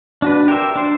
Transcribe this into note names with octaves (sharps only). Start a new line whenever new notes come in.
D4 F#4 B4
G4 A#4 C5 E5
D4 C5